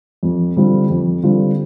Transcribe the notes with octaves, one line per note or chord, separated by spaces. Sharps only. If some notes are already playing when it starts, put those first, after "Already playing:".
F2
D3 G3 C4 F4
F2
D3 G3 C4 F4